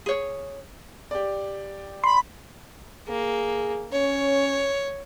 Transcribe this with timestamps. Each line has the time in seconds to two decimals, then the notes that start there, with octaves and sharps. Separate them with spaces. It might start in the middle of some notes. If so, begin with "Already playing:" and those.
0.06 G#4 C#5
1.11 G4 D5
2.04 B5 C6
3.08 A#3 G#4
3.93 C#4 C#5